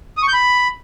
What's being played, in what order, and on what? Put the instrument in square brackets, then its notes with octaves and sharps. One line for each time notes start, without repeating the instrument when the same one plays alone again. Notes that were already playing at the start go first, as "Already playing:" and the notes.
[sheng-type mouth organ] D#6
C#6
G6
B5